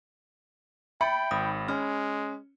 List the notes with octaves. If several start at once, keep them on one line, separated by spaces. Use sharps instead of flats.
E5 G5 B5 C#7
G#1 D#6
G#3 C#4 F6